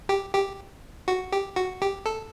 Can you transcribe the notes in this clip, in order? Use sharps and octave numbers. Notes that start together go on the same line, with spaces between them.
G4
G4
F#4
G4
F#4
G4
A4